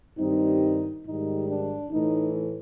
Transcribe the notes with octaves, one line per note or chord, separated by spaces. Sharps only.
G2 D#3 G3 C4 D#4
G#2 D#3 G3 D#4
D4
A2 E3 A3 D#4